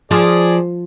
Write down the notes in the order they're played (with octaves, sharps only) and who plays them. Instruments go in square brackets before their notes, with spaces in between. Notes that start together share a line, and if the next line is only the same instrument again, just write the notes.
[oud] F3 [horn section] G#4 D5